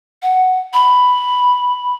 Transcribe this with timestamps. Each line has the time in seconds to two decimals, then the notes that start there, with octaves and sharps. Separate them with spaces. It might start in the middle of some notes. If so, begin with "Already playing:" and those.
0.23 F#5
0.74 B5